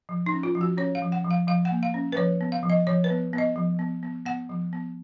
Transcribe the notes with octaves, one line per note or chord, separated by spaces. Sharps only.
F3
D#4
C#4
F4
F3
F#4
C#4 C#5
F5
F3
F#5
F3
F5
F3 F5
F#5
A#3
F5
C#4
B4
F3 C#5
B3
F5
F3
D#5
F3 C#5
B4
B3
B3
D#5
F3
B3
B3
B3 F#5
F3
B3